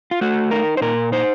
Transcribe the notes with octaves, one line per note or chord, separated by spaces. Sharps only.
F4
A3 F#4
D#4 A#4
C5
A#2 A#4
D#4 C5